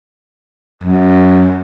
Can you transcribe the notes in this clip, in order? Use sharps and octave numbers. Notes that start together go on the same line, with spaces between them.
F#2